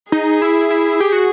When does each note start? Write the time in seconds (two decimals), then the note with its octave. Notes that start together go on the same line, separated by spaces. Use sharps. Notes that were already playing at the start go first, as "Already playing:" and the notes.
0.12 D#4 G#4
0.42 E4
0.71 E4
1.01 G4
1.12 F#4